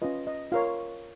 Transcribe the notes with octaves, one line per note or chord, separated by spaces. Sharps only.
C#4 F4 B4 D#5
D#5
F4 A#4 C#5 F5